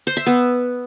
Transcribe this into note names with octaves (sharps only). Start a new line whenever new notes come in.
C5
E5
B3